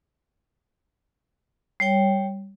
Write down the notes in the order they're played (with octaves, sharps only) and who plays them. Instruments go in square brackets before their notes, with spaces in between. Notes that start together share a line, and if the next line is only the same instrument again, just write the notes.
[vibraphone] G3 C#5 G5